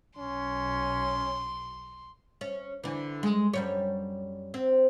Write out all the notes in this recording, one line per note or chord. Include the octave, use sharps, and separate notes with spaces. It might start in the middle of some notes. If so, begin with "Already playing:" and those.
B1 C#4 C6
C#4
D3 E3
G#3
F#2 G3 C#5
C4